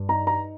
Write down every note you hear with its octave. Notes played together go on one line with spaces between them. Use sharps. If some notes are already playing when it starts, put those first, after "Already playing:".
Already playing: G2
D#4 A#5
A#5